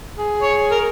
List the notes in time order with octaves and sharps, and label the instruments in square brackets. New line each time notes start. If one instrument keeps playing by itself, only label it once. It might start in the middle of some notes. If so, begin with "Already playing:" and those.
[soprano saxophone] G#4
[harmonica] C#5
A#4